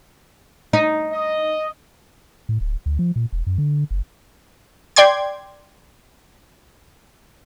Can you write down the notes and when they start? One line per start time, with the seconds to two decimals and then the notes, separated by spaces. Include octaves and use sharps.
0.73 D#4
1.12 D#5
2.49 A2
2.61 D1
2.86 D2
2.99 F3
3.16 A#2
3.32 E1
3.47 F#2
3.58 D3
3.91 F#1
4.96 D5 G5 C6 D6 G#6